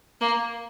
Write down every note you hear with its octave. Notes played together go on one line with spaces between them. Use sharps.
A#3